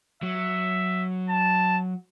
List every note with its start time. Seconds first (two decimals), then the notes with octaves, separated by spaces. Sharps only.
0.23 F#3 E5
1.29 A5